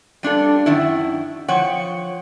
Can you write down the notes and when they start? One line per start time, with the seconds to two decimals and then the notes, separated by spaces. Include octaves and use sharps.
0.23 G3 D4 F4 A4
0.66 F#2 D#3 E4
1.48 F3 C#5 F#5 G5